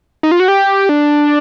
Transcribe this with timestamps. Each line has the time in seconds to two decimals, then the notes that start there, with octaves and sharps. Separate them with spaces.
0.23 D#4
0.32 F4
0.40 F#4
0.48 G4
0.89 D4